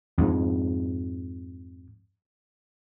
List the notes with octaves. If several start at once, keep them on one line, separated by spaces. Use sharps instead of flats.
F2 G#2